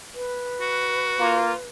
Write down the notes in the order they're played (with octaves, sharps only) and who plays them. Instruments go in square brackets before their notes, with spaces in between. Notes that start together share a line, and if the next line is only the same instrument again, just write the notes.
[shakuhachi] B4
[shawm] F#4
[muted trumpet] A#3 [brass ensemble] F4